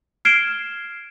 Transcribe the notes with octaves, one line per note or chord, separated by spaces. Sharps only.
F6 G#6 C7 D7 E7 G7